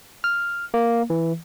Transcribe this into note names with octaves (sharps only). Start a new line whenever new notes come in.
F6
A#3
E3